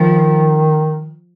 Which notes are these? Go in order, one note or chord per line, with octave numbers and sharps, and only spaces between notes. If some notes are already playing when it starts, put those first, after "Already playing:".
Already playing: D#3 F3